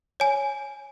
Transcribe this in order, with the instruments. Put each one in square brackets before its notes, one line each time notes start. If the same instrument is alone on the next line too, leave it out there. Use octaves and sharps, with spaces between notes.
[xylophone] C#5 G#5